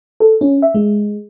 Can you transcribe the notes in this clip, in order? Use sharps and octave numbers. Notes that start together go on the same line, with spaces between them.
A4
C#4
E5
G#3